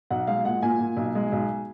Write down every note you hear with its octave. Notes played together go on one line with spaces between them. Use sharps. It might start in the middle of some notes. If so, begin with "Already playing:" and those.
B1 F#5
G#3 F5
A#2 F#5
A#2 G#5
A#2
B1
G#3
B1